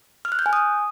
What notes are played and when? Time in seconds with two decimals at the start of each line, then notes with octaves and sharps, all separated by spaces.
0.25 F6
0.32 F#6
0.39 G6
0.46 G#5
0.53 D#6